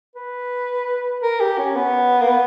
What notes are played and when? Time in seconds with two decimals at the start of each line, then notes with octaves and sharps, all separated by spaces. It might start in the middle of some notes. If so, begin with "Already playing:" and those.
0.16 B4
1.23 A#4
1.40 G4
1.58 C#4
1.76 B3
2.22 A#3
2.28 B3